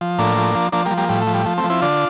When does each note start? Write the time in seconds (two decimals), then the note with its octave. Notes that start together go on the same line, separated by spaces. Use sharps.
0.01 F3
0.18 A2 A#3 D4
0.37 F3
0.55 F3
0.72 F3 A#3 D4
0.85 G3 A#3
0.91 F3
0.98 G3 A#3
1.09 A2 G3
1.22 A3
1.27 F3
1.34 G3
1.46 F3 A3
1.58 A3 C4
1.64 F3
1.70 C4 E4
1.81 D3 D4 F4